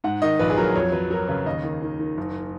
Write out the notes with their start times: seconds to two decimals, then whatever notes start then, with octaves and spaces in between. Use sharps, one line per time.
0.04 G#2 F#5
0.22 D#3 D#5
0.39 A#1 B4
0.50 G#4
0.57 F#3 A#4
0.76 F2 C#5
0.92 F#3 B4
1.11 F#3 A#4
1.28 C#3 B4
1.46 D#2 D#5
1.64 D#3
1.82 D#3
1.99 D#3
2.17 F#1